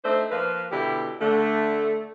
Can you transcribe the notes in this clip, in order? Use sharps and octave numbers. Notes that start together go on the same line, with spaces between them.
A3 C4 D4 D#4 C5
F3 A#3 B4
B2 D3 E4 G4
D3 A3